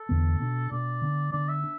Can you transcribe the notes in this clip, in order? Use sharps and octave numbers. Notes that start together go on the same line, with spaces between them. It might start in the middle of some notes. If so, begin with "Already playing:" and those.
Already playing: A4
E2 D3 B3 D4
B2 B3 D4
B2 B3 D4 D5
D3 B3 D4
D3 B3 D4 D5
E5
D4